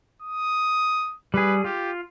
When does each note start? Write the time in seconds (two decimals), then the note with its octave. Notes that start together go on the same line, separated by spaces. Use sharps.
0.22 D#6
1.34 G3 G#4 B4
1.64 F4 G4